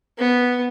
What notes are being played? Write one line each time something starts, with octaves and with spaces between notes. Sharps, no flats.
B3